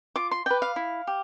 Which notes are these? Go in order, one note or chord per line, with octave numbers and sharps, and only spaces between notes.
F4 D6
C6
B4 D5 G5
F5
E4
G4